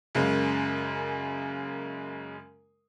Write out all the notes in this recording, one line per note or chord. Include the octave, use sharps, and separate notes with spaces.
F#2 C#3 G#3 A#3